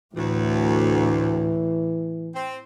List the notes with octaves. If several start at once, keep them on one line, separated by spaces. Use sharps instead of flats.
D2 A2 E3
C4